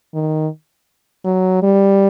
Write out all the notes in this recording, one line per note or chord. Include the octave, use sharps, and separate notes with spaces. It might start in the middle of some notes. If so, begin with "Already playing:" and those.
D#3
F#3
G3